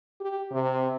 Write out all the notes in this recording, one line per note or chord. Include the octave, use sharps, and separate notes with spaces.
G4
C3